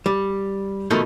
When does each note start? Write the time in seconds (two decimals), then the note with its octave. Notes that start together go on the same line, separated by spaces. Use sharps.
0.06 G3
0.90 B2 D#3 F3 A3 D#4